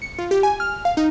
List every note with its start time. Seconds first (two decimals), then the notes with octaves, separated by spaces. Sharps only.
0.02 C#7
0.19 F4
0.31 G4
0.43 G#5
0.60 F6
0.85 F5
0.97 D#4